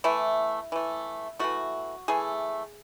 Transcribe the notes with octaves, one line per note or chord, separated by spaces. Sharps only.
E3 A3 E4
E3 A3
E3 A3 F#4
E3 A3 G#4